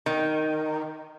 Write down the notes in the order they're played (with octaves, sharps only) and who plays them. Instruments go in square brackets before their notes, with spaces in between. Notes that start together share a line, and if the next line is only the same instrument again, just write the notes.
[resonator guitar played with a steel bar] D#3